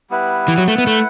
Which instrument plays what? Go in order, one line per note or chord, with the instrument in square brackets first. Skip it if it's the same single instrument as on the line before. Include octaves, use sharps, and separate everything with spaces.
[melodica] G3 B3 E4 B4
[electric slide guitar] E3
F#3
[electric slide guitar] A3 [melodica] E4 B4 F#5
[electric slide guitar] B3
A3